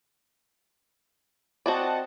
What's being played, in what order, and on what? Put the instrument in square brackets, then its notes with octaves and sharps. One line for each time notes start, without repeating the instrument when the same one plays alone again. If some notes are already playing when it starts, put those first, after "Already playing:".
[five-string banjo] C4 F#4 D5 [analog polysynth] D#5 F#5 A5